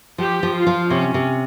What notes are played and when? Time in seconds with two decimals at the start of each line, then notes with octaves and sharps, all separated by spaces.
0.18 F3 G4
0.43 F3
0.54 F4
0.67 F3
0.90 C3 C#4
1.14 C3